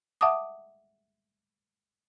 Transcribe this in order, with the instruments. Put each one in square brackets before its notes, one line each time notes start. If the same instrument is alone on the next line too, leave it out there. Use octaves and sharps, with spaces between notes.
[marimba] E5 F#5 A5 D6 D#6